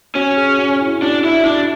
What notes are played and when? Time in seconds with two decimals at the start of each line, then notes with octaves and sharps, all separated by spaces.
0.15 C#4 F#4
0.37 G#4
0.58 F#4
0.81 E4
1.02 D4 F#4
1.24 E4
1.45 D4 F#4